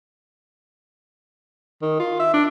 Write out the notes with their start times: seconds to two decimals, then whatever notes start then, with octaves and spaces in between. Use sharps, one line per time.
1.82 D#3
1.99 F4
2.19 E5
2.33 D4